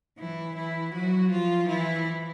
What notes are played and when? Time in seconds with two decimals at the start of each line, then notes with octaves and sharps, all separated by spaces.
0.18 E3 E4
0.56 E3 E4
0.93 F#3 F#4
1.32 F3 F4
1.69 E3 E4